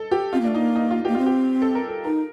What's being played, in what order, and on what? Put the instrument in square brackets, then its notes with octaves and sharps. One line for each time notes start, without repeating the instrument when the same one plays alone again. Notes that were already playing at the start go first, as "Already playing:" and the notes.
Already playing: [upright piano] A4
G4
[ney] C4 [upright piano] F4
[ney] A#3
[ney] A3 [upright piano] D4
[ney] A#3 [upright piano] D#4
[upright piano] D#4
F4
[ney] A#3 [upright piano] G4
[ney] C4 [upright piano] F4
[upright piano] G4
A4
A#4
A4
[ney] D#4 [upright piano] A#4